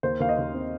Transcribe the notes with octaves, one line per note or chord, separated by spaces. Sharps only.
D#2 C5
D#2 F5
D#5
D#2
C4